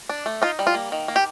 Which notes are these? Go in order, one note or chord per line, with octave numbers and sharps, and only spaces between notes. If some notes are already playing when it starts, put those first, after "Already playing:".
D4
A3
D#4 F4
G3
F4
A#3
D#3
A#3
G4